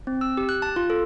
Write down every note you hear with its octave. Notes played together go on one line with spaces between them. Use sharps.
C4
E6
G4
F#6
A5
F4
A4